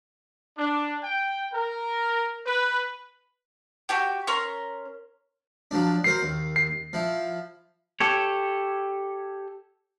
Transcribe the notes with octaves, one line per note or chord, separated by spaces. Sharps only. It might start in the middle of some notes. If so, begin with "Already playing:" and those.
D4
G5
A#4
B4
F#4 G4 G5
C#4 A#4 C6
F3 F#3 D4
F#3 A#4 C5 C7
D#2
C7
F3 E4
G4 A4 C#5